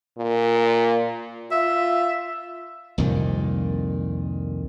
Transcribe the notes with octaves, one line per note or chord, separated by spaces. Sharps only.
A#2
F4 E5
C2 F2 A#2 D#3